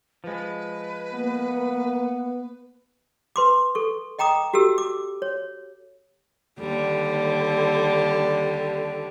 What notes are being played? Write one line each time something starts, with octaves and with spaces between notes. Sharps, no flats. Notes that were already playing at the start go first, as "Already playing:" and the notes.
F3 G#3 B4
A#3 B3
B4 C6 D6
A4 C#6
D#5 G5 A#5 D6 D#6
F#4 G4 A4 E6
D6
C#5
D#2 D3 G3